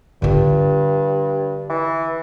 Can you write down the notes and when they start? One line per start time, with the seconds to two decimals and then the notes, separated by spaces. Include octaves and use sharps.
0.22 G2 D3 F4
1.69 E3